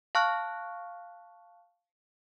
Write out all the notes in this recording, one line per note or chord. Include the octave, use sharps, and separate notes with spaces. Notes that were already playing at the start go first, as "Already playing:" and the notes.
F5 A5 C#6 F6 F#6